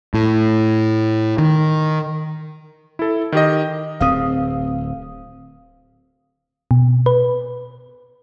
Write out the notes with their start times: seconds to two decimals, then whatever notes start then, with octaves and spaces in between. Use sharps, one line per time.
0.14 A2
1.38 D#3
2.99 E4 A4
3.32 D#3 G4 D#5
4.01 D1 C4 F5 D#6
6.71 B2
7.06 B4